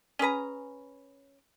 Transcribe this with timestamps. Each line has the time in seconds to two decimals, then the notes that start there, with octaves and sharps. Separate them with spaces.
0.19 C#4 G#4 B4 A#5